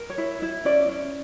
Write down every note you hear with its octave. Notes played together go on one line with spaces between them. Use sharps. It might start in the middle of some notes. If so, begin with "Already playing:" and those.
Already playing: A#4
C#5
E4
E4
C#4 D5
C#4